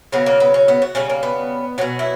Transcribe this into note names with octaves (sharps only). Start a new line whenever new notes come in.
C#3 F#3 B3
A#3
B3
C#4
B3
F#4
C#3 G3 C#4
A#3
B3
B2 F#3 C#4
E4